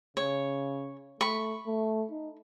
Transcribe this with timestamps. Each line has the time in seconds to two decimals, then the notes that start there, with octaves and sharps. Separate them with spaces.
0.17 C#3 C#5
1.21 A3 B5 C#6
1.67 A3
2.11 D#4